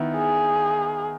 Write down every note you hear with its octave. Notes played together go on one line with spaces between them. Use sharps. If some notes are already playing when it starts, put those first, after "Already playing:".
Already playing: D#3 B3 E4
G#4